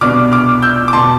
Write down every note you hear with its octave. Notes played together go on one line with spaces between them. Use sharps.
C2 B2 B3 D4 D6 F6
D6 F6
E6 G6
D6
E1 B2 A5 C6